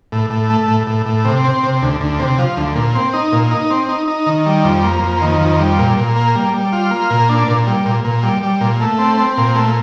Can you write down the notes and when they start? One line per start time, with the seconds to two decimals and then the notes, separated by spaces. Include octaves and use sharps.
0.12 A2
0.30 A2
0.50 A3
0.68 A2
0.87 A2
1.06 A2
1.25 C3
1.44 C4
1.63 C3
1.82 D2
2.01 D2
2.20 C3
2.39 F3
2.57 D2
2.76 A#2
2.95 C4
3.13 D#4
3.32 A#2
3.51 D#4
3.71 C4
3.89 D#4
4.08 D#4
4.27 D#3
4.46 G3
4.65 F2
4.84 A#3
5.03 F2
5.21 D#3
5.41 F2
5.59 G3
5.79 A#2
5.98 A#2
6.16 A#3
6.35 G3
6.54 G3
6.73 F4
6.91 A#3
7.10 A#2
7.29 D4
7.48 A#2
7.67 G3
7.86 A#2
8.04 A#2
8.23 G3
8.43 G3
8.61 A#2
8.80 A3
8.99 C4
9.17 C4
9.37 A#2
9.56 A3